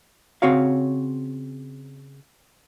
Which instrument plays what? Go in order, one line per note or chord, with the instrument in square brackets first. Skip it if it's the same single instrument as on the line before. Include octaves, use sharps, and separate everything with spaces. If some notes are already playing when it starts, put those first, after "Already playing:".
[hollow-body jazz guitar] C#3 C4 F#4 C#5 F5